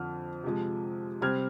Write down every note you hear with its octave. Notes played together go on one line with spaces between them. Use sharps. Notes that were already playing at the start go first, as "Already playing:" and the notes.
Already playing: F2 D3 F3 F6
C3 F3 G#3
C3 G3 C4 F6 G#6